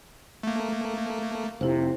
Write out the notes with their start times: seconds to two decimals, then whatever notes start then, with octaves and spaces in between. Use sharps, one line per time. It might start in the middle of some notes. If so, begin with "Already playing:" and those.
0.43 A3 A#3
1.61 F1 C3 E4 C5